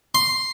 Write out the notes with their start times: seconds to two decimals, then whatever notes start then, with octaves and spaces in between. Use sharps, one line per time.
0.15 C6